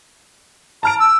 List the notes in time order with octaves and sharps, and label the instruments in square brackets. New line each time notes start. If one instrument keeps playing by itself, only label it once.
[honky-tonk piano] A5 F6 D7 [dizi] A#5
[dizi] E6